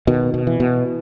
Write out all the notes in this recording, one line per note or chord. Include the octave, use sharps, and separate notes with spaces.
B2 D#3
B2
E3
B2